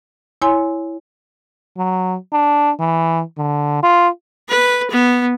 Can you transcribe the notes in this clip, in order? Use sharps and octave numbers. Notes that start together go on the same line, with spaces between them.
E4 C#5 G#5 C6
F#3
D4
E3
D3
F4
B4
B3